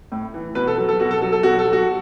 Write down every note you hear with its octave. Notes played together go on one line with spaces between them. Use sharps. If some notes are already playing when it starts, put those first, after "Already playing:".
A2
E3
B2 B4
A4
F#3
A4
B2 F#4
A4
F#3 A4
A4
B2 F#4
A4
F#3
F#4